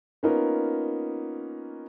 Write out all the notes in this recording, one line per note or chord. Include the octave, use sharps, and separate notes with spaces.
A#3 B3 C#4 D#4 F4 A#4